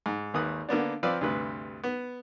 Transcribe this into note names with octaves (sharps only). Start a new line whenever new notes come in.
G#2
G#1 D#2 B4 D#6 F#6
D3 A#3 B3 D4
F3 C4 B4 D5 F5 E6
D2 G2 C3 B4
B3